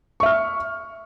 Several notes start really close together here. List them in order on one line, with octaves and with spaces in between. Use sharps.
C#6 E5 F6